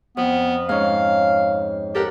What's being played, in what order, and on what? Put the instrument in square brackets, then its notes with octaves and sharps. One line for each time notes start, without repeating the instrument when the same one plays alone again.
[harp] F2 [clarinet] B3
[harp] G#2 C#4 [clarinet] F5
[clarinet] G4 [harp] A4 A#4 F#5